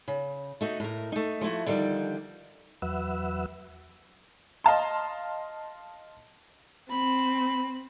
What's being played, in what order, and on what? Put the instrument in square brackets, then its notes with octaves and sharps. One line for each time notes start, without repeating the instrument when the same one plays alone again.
[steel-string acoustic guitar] C#3
A3 D#4 F#4
A2 A#4
A3 D#4
F3 A3 E4 F#4
D3 D#3 F3 G3
[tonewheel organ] E2 F#3 B4 E5 F#5 E6
[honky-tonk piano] D#5 F5 A5 C6
[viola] C4 [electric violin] B5